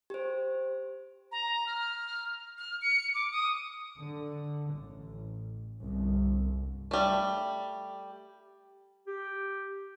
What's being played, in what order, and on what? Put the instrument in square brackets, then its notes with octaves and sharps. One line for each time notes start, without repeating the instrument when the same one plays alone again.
[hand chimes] G4 C5
[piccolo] A#5
F6
F6
C#7
D6
D#6
[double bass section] D3
A1
G1 C2
[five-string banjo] G3 A3
[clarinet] G4